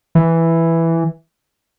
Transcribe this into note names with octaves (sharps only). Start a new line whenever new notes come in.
E3